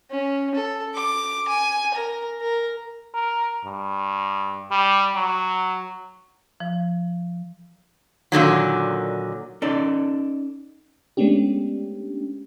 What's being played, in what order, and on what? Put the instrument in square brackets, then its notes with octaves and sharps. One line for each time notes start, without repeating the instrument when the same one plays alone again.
[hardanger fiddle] C#4
A4
D6
G#5
A#4
A#4
[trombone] A#4
G2
G3
F#3
[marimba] F3
[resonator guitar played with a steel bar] A#2 D3 D#3 F#3
[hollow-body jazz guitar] C#4 D#4 A4 D5
[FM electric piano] G#3 A3 B3 C#4 D4 G4